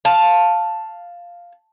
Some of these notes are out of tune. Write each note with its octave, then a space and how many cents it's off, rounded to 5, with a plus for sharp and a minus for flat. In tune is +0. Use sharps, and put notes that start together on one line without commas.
F5 +0 A5 +0